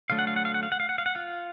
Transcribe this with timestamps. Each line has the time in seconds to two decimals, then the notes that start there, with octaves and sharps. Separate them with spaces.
0.10 D3 F#3 A3 F5
0.19 F#5
0.27 F5
0.36 F#5
0.45 F5
0.54 F#5
0.63 F5
0.72 F#5
0.80 F5
0.89 F#5
0.98 F5
1.06 F#5
1.15 F4 F5